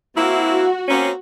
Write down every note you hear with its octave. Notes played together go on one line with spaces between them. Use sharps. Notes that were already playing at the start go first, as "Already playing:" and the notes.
A#3 C4 E4 F#4
A#3 C4 C#4